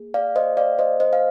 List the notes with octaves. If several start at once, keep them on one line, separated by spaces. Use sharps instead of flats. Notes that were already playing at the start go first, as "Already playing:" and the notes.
Already playing: A#3 G#4
D5 F5
C5 D#5
D5 F5
C5 D#5
C5 D#5
F5